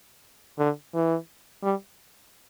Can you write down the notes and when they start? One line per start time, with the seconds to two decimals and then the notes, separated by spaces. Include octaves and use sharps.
0.59 D3
0.94 E3
1.63 G3